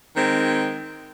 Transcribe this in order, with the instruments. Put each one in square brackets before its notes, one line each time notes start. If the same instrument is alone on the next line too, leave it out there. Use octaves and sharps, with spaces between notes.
[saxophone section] D#3 G#3 C4